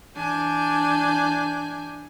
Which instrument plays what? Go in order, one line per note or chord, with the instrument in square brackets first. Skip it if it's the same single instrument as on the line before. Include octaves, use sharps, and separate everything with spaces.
[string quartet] E3 D4 G#5 G6